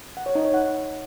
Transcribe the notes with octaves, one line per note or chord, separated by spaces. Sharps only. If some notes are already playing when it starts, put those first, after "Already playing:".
F#5
C#5
D#4
C#5
F#5